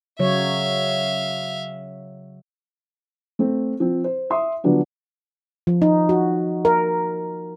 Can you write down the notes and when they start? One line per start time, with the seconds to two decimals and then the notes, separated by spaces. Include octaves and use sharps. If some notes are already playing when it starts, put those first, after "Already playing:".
0.19 C#3 F#3 C#5 E5 F5
3.39 A3 C4
3.80 F3 C4
4.04 C5
4.30 E5 C6 D#6
4.64 D3 F3 F#3 B3 D4
5.67 F3
5.82 D#4
6.09 F#4
6.65 A#4